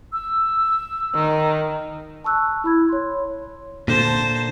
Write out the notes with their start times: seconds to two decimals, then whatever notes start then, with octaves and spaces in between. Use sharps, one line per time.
0.13 E6
1.15 D#3
2.24 A5 C#6 E6 F#6
2.64 E4 B5 G#6
2.89 C#5 C6
3.88 A#2 D3 C5 A5